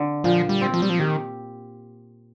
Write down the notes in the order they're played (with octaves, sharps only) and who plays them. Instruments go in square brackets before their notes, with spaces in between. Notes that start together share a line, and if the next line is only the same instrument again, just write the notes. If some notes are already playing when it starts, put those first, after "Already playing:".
Already playing: [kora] D3
[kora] A#2 [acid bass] F3
[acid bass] G3
[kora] C4
[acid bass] F3
G3
F3
[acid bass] D#3 [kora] G4